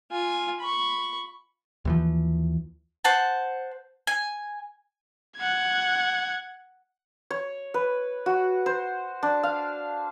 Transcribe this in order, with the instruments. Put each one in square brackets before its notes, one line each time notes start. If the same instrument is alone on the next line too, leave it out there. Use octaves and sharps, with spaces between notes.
[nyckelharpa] F4 G#5
B5 C#6
[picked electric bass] D#2 E3 F3
[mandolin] C5 F#5 A5
G#5
[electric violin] F#5 G#6
[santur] C#5
B4
F#4
C5
D4
F5